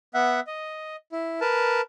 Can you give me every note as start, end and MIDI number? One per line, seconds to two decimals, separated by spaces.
0.14 0.40 59
0.14 0.40 76
0.14 0.40 78
0.47 0.96 75
1.12 1.40 64
1.41 1.81 70
1.41 1.81 71
1.41 1.81 81